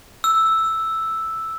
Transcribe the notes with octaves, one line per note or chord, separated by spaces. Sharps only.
E6